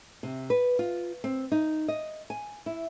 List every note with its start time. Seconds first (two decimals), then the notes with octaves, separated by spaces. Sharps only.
0.23 C3
0.50 B4
0.79 F4
1.24 C4
1.52 D#4
1.88 D#5
2.30 G#5
2.66 E4